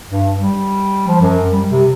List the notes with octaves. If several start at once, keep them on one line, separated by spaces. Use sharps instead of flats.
G2
G3
F3
F#2
G3
C3